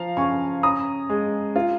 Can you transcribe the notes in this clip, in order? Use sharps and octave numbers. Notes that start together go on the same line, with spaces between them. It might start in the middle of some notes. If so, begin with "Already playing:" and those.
Already playing: F3 F5 A#5
C#3 G#5 C#6
C#4 A#5 D#6
G#3
F4